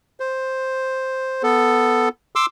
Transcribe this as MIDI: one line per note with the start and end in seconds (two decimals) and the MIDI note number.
0.20 1.43 72
1.43 2.09 59
1.43 2.09 69
2.36 2.46 84
2.36 2.46 86
2.36 2.46 88